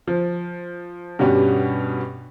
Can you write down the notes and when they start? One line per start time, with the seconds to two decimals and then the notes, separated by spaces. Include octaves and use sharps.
0.07 F3
1.19 G2 B2 B3 C#4 G4